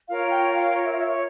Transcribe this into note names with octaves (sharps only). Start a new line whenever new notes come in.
F4 A#4 C#5 F5
G5
F5
C#5
E5
C#5
E5
C#5